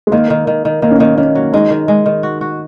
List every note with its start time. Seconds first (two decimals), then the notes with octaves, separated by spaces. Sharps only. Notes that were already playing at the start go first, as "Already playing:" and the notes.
0.07 G#3
0.12 D#3 A#3
0.30 D#3
0.47 D#3
0.65 D#3
0.82 D#3 A#3
0.91 C#4
0.98 D#3 A#3
1.17 D#3 C#4
1.35 F#3
1.53 G#3 D#4
1.70 D#3
1.88 G#3
2.06 D#3
2.23 F#4
2.41 F#4